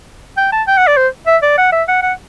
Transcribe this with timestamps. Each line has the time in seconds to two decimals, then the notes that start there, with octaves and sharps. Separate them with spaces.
0.37 G5
0.52 A5
0.67 G5
0.77 F#5
0.87 D5
0.97 C5
1.27 E5
1.42 D5
1.58 F#5
1.72 E5
1.88 F#5
2.02 F#5